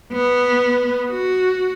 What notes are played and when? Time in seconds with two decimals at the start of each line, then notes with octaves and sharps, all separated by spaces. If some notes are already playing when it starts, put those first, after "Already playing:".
0.12 B3
1.10 F#4